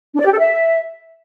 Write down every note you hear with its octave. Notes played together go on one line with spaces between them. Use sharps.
D4
D5
G4
A4
E5